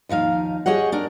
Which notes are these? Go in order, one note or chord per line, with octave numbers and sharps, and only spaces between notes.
D#2 F3 D#4 F5
G4 G#4 C#5 D#5 F#5
D4 A#4